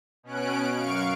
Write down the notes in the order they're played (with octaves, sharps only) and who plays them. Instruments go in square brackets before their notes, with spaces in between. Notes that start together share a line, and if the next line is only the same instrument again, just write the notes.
[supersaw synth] B2 C#4 F#6 D7
F#2 F5 C#6 D7